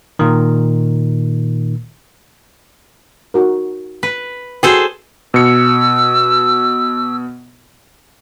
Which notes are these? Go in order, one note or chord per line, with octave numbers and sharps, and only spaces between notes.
A#2 D#3
D#4 F#4 A#4
B4
F#4 G#4 A4 B4 C5 G5
B2 E6 C#7